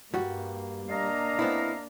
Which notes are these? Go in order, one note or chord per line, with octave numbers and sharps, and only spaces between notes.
G2 G3 A#3 F#4
A#3 D4 D#5 F5 A#5
B3 C4 E4